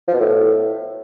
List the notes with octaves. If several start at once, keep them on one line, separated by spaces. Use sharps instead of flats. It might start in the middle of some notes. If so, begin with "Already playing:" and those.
F3
B2
A2